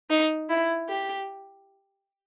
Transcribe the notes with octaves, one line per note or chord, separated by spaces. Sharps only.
D#4
E4
G4